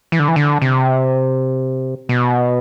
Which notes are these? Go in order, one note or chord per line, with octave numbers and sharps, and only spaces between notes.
E3
D3
E3
D3
C3
B2